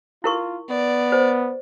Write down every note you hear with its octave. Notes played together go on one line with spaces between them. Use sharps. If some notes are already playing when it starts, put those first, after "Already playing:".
E4 F4 A#4 C#6
B3 D5
C5